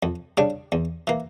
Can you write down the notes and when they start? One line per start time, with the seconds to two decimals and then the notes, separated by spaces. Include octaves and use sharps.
0.03 F2
0.37 C#3 G3 D4
0.72 E2
1.07 E3 A#3